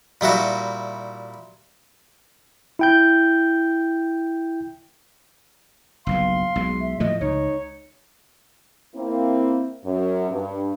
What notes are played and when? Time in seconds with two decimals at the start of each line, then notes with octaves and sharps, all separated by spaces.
0.21 A#2 G3 E4 F#4
2.79 E4 G5 G6
6.07 F#1 B1 G2 F5 C6
6.56 B1 G#3
6.81 E5
7.00 A2 F3 A3 D#5
7.21 C#2 D#4 C#5
8.95 A#3 C4 E4
9.84 F#2
10.30 G2